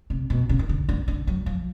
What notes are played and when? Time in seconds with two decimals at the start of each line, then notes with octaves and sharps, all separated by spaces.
0.10 C3
0.30 B2
0.49 C#3
0.59 D#3
0.69 D3
0.89 D3
1.08 D3
1.27 F#3
1.46 F3